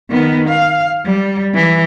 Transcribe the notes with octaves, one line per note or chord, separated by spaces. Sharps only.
D#3 B3
F5
G3
E3